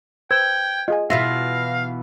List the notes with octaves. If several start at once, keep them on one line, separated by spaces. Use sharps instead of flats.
B4 C5 G5 E6 G#6
F4 G#4 D#5 G#5
B2 E3 F4 E5 F5 A#6